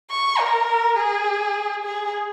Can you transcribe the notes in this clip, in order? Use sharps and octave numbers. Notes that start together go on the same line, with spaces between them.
C#6
A#4
G#4
G#4